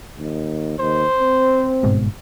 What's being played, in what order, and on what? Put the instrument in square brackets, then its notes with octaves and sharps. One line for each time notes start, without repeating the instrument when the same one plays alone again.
[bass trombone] D#2
[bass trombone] D#2 [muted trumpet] C5
[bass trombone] C4
[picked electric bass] G1 G#2 B2